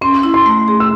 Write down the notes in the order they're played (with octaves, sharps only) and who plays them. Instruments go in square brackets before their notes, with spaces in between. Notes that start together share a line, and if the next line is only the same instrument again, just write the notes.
[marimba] C#4 [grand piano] C6
[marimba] E4
[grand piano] C6
[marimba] A3
G#4
[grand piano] E6